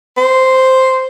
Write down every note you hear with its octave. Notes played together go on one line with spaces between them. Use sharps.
C5